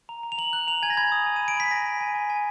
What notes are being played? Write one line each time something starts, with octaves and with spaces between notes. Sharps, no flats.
A#5
A#5
F7
A#5 F#7
F#6 F#7
A#5 F7
G#5 G#6
A#6
B5 G#6
D#6
G#5
D#7
B5
D7
B5 B6
G#5 A#6
G#5
G#5
G#5
G#5